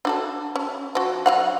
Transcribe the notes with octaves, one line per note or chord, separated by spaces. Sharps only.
D4 F#4 A4
C#4
F3 F#4
F#3 F5 F#5